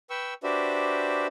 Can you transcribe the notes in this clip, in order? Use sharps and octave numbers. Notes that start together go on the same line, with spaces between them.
B4 G5 C#6 E6
D4 F#4 G4 B4 C5 E5